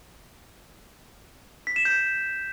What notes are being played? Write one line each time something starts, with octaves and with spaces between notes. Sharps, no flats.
B6
E7
G6